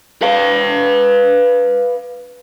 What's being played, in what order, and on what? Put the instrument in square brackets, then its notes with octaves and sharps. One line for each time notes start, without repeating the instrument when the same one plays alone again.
[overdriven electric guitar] B4 F5